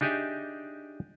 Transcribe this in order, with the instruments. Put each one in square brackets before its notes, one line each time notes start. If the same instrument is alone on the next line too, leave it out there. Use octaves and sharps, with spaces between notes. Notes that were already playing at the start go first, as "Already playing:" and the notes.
[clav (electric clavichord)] D4 D#4 G4 G#4 D#5 E5